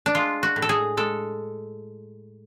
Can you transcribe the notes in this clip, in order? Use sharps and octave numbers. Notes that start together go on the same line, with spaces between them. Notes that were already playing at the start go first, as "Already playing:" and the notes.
D4
G#3 F4
F#4
A2
A4
G#4
G#3 A4